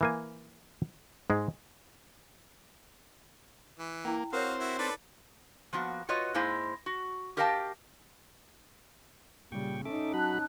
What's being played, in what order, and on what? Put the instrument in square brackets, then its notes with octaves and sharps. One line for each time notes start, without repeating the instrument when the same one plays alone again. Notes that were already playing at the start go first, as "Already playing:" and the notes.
[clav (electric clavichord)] E3 A#3 G#5
G#2 G#3
[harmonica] E3
[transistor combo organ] A#3 [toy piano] E4 G5
[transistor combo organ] C4 C5 [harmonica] F#4 F5 [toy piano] A#4 C#5
[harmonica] E4 F#4
[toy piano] D#4 [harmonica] A4 B4 D5
[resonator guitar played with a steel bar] F3 A#3 B3 F#4
F4 F#4 B4 C#5 D#5
G#2 G#3 A#3 E4 C5 G#5
F#4
G4 A#4 D#5 F5 G5 A5
[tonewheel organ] A#2 G5 C#6 [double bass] C#3 G3
[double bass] C#4 D#4 [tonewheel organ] A4 E5 D6
[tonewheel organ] F#3 F#4 B5 [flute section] A5 F#6